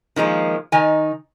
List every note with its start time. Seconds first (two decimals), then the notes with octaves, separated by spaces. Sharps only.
0.16 D#3 F3 G#3 A#3
0.72 D#3 D#4 G#5